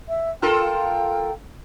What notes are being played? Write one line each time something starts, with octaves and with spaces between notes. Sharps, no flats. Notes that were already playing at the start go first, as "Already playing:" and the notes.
E5
F4 A4 A#4 G5